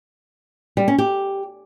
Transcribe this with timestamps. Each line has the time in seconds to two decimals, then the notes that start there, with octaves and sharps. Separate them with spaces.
0.77 G3
0.88 C#4
0.98 G4